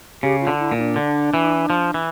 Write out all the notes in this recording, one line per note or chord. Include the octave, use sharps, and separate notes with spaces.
C#3 G4
F4
D3
E4
A#2
E4
D4
D3
E3
F3
E3